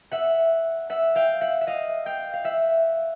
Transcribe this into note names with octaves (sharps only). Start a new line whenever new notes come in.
E5 F#5
E5 F#5
F5 G5
E5 F#5
E5
D#5 F5
F5 G5
F5
E5 F#5